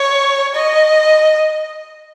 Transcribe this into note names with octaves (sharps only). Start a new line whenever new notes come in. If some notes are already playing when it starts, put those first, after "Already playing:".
Already playing: C#5
D#5